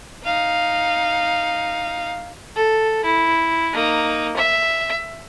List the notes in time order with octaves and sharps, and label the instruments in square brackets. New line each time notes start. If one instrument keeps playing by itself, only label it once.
[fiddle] D#4 F5
A4
E4
A#3 D#4
E5